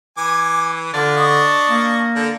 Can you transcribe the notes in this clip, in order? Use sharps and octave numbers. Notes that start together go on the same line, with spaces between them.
E3 G#5 D6
D3 D4 F4
D#5 C#6
A#3
D3